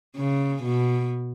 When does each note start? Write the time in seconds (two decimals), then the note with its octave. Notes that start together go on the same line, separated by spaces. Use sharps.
0.16 C#3
0.63 B2